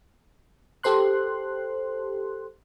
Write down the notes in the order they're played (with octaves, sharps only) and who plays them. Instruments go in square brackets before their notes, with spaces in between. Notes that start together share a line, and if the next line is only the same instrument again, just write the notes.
[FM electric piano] G4 A4 C5 C6 F#6